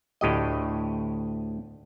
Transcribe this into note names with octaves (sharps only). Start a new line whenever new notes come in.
D2 A2 G4 D#5